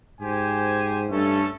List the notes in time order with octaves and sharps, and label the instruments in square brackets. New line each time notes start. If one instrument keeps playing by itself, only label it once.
[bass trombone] G#2 [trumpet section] G4 C5 G#5
[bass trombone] G2 [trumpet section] A3 C#4 A4